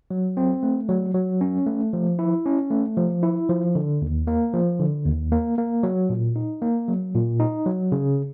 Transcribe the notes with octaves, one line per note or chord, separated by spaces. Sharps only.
F#3
C4
A3
F#3
F#3
C#4
A3
F3
E4
C#4
A3
F3
E4
F3
D3
D#2
A#3
F3
D3
D#2
A#3
A#3
F#3
A#2
D#4
A#3
F#3
A#2
D#4
F#3
C#3